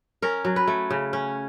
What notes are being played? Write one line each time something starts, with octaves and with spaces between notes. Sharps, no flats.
C#4 A#4
F#3
B4
A3
C#3
C#4